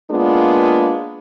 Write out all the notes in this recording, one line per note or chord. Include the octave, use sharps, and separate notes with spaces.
G#3 A#3 B3 D4 F4